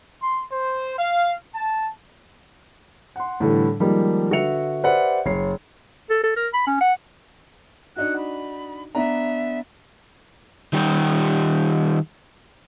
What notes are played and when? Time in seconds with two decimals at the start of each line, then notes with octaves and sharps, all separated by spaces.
0.22 C6
0.52 C5
0.98 F5
1.53 A5
3.16 F#5 C6
3.40 A2 D3 E3 G3
3.80 D#3 F3 G3 G#3 A#3
4.31 D3 F#4 B4 E5 C#7 F7
4.83 G4 B4 C5 D5 E5 F#5
5.26 F#1 C#5 C7
6.10 A4
6.24 A4
6.36 A#4
6.54 B5
6.67 C#4
6.81 F#5
7.96 D4 D#4 F#4 F#5 F#6
8.17 B5
8.95 B3 D4 E5 A#5
10.73 D#3 G3 G4